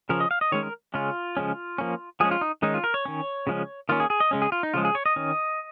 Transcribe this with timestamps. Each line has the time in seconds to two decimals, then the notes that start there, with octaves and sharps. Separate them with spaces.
0.09 C#3 F3 C#4 A#4
0.20 D#5
0.31 F5
0.41 D#5
0.52 D#3 G#3 C#4 C#5
0.63 A#4
0.94 C#3 G#3 C#4 F4
1.37 C#3 F3 G#3 C#4
1.78 F3 A#3 C#4
2.20 F3 G#3 C#4 G#4
2.31 F4
2.41 D#4
2.62 D#3 G#3 C#4 D#4
2.74 F4
2.84 A#4
2.94 C#5
3.05 D#3 C#4
3.47 C#3 F3 G#3 C#4
3.89 D#3 A#3 C#4 F4
4.00 G#4
4.10 G#4
4.20 D#5
4.31 C#3 G#3 C#4
4.42 G#4
4.52 F4
4.63 D#4
4.74 C#3 F3 G#3 F4
4.85 G#4
4.95 C#5
5.06 D#5
5.16 D#3 C#4